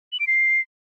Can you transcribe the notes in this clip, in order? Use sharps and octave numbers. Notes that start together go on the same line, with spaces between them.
F#7
D7
C7